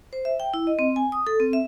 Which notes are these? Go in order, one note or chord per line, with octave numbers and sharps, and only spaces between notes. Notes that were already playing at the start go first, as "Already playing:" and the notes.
C5
E5
G5
E4
D#5
C4
G#5
D#6
A4
C4
E5